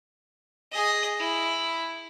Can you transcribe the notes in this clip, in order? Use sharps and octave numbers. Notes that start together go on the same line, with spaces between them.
G#4 D#5
E4